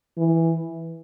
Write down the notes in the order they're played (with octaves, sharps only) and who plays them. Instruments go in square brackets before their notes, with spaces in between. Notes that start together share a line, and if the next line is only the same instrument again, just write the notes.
[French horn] E3